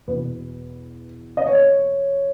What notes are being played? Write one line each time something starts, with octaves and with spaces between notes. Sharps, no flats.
E2 B2 B4
D#5
C#5